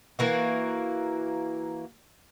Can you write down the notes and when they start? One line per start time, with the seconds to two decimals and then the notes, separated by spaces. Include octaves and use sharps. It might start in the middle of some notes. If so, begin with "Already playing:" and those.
0.19 E3 A#3 F#4